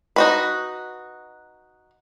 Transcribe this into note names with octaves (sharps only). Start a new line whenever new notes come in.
D#4 F#4 B4